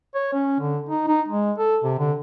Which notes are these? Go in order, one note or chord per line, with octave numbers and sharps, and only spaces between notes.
C#5
C#4
D3
D#4
D#4
G#3
A4
C3
D3